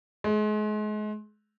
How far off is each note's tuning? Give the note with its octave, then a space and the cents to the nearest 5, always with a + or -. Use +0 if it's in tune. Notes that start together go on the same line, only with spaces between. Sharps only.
G#3 +35